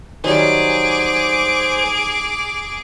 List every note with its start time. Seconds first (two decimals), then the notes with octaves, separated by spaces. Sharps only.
0.24 D#3 F#3 G3 G#4 C5 G#5 D6